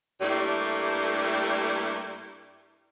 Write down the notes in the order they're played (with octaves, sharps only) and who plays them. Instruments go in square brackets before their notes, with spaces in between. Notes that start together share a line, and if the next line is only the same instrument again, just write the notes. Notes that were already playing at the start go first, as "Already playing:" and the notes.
[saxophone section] G2 G3 A3 A#3 E4